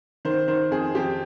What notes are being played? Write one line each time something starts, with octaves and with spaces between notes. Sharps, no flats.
D#3 C5
D#3 C5
F2 G#4
F2 G4